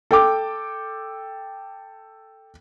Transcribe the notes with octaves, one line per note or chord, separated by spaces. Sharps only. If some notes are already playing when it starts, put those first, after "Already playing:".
A4 G5 D6